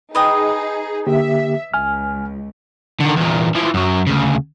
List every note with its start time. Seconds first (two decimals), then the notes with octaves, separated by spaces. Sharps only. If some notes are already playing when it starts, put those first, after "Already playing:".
0.15 D#4 G#4 B4 D#5 G5
1.07 D3 A#3 G4 E5
1.74 C#2 G#5 F6
3.01 D3 D#3
3.17 E2 A#2
3.55 E3 F3
3.74 F#2 F#3
4.07 D2 C#3